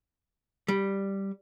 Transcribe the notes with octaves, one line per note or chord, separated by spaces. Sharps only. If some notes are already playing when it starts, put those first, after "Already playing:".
G3